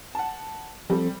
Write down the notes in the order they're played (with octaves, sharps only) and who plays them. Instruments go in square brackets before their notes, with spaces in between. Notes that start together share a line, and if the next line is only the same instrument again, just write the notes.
[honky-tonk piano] F#5 A5
[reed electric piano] F3 C4 A4 [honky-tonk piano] G3